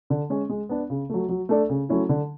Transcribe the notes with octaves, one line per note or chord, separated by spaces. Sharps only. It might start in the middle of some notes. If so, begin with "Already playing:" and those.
D3
G#3 C#4
G#3
B3 D4
C#3
F#3 A3
F#3
A3 D4 A4 D5
C#3
F#3 A3 C#4 E4
D3